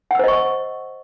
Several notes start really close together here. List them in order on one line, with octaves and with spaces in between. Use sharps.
F#5 E6 C5 D#5 C#6